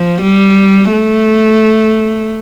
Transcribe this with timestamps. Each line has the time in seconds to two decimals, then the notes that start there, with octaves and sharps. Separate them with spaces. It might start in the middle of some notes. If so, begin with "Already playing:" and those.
Already playing: F3
0.22 G3
0.92 A3